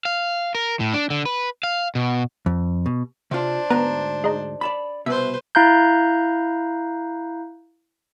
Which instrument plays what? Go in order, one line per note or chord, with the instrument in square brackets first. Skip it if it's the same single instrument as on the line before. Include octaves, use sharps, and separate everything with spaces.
[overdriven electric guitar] F5
A#4
A2
D4
D3
B4
F5
B2
[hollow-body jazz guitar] F2
B2
[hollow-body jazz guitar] C3 F4 [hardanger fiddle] D4 C5
[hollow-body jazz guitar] D2 G#2 A#5 [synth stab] B3
[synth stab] G#3 D#4
[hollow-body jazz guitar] D5 A5 B5
[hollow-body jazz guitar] C2 B2 [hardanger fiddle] B4 C5 [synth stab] E5
[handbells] E4 F5 A#5 F#6 G6